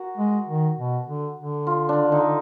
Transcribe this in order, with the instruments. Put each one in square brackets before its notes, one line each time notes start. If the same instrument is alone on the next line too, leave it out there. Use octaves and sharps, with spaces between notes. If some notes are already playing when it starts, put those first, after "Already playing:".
Already playing: [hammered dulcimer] F#4 A#4
[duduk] G#3
D#3
B2
D3
D3
[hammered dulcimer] F4
D4
D#4